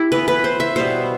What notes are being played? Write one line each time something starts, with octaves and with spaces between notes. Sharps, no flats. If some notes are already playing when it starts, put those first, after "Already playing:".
Already playing: E4 G4
E3 B3 B4
B4
C5
E5
B2 G3 B3 C5